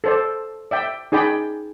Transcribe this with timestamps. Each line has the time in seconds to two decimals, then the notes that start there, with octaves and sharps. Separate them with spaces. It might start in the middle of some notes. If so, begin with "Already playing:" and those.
0.04 A4 C5 D5
0.71 D5 E5 G5
1.12 D#4 G#4 D5 G5 B5